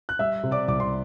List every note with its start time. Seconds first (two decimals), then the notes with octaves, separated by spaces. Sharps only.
0.09 F#6
0.19 G3 E5 E6
0.43 C3
0.51 D5 D6
0.68 C2 D6
0.80 C6